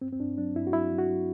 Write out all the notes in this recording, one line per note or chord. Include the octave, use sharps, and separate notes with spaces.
G2 C4
C4
G2 D4
F#3 D4
G2 E4
F#4
F#3 E4
F#3
F#4
F#3